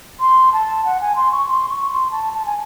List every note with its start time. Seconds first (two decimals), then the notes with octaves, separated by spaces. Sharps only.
0.20 C6
0.53 A5
0.85 F#5
1.01 G#5
1.16 C6
1.32 C#6
1.49 C6
1.70 C#6
1.91 C6
2.11 A5
2.33 A5
2.46 G#5